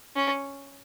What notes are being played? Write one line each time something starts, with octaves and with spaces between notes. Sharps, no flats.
C#4